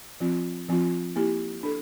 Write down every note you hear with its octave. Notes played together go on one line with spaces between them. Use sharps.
F3 C4 F4
F3 C4 F4
A#3 E4 G4
D4 A4